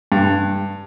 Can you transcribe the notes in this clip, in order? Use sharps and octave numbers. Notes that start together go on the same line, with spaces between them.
G2